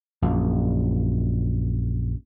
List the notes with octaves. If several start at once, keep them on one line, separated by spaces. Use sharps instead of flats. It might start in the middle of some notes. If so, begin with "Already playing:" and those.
A#1 F#2